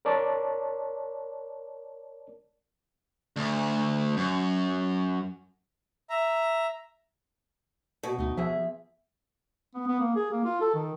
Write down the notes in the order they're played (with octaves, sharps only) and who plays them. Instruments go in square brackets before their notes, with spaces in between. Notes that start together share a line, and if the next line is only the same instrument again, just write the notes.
[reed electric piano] A#4 C#5 D5 A5
[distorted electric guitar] D2
F#2
[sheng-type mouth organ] E5 A#5
[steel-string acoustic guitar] B2
[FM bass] D2 [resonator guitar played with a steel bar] D#4 D#5
[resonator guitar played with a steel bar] F2 G#4 E5 [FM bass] F3
[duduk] B3
B3
A#3
G#4
A#3
F4
A4
D#3